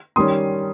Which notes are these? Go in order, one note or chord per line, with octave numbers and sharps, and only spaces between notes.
D#3 G3 C#4 C6 D#6